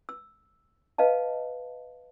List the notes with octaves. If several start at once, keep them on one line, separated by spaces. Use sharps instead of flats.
E6
B4 D#5 F5 A5